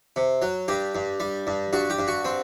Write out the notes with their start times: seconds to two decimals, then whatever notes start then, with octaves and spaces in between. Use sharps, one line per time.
0.16 C3
0.42 F#3
0.68 G2 G4
0.95 G2
1.20 G3
1.47 G2
1.73 G2 F#4
1.90 G4
1.99 G2
2.08 F#4
2.25 C4